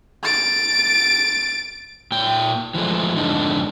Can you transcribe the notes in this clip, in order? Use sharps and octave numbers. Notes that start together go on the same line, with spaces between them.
A6 D7
A#2 G5
E3 F3 G#3 A3
F2 G#2 D3 D4 D#4